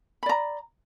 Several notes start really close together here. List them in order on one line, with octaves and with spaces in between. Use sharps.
B5 D5 A#5